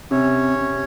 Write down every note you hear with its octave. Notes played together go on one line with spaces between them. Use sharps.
C3 C#4 C#5
C3